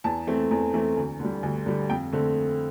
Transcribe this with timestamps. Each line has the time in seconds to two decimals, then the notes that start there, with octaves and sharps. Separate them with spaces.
0.04 E2 A5
0.27 E3 A3 C4
0.51 E2
0.74 E3 A3 C4
0.97 D2
1.20 D3 G3
1.43 D2
1.66 D3 G3
1.90 F2 G5
2.13 D3 A3 C4